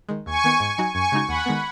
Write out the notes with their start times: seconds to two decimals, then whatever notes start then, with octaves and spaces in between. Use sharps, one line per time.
0.09 D#3 G#3
0.26 D#2 G#5 C#6
0.44 D#3 B3
0.60 G#2
0.78 F#3 D#4 F#4
0.94 F#2 G#5 C#6
1.12 C#3 G#3 D#4 F#4
1.28 D#2 F#5 B5
1.46 D#3 G#3 B3